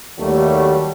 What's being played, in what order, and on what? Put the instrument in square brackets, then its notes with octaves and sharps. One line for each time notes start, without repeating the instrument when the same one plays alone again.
[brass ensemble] D#2 F#3 G3 A3